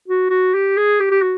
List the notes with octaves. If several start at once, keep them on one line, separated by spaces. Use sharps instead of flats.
F#4
F#4
G4
G#4
G4
G4
F#4